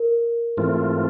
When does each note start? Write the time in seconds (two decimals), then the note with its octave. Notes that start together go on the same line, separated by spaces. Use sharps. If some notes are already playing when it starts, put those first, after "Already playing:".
Already playing: A#4
0.57 G#2 E3 A3 C4 F4